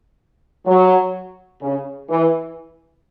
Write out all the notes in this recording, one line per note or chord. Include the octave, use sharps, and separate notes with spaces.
F#3
C#3
E3